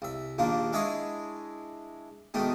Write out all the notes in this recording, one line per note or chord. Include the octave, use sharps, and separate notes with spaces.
C2 E5
A#1 D#2 A#2 A#3 D4
G#3 D4 E4 G#4 C#5 D#5
G#2 B2 D#3 A3 D#4